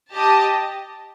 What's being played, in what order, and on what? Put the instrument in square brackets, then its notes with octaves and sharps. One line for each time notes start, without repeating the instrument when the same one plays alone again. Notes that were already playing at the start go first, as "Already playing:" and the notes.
[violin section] G4 D#5 A5